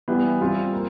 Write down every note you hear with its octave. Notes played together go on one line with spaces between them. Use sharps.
E3 G3 B3
G3 C4 F4
A#3